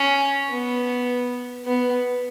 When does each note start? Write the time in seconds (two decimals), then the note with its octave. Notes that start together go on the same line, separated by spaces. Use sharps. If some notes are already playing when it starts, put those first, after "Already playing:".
Already playing: C#4
0.50 B3
1.65 B3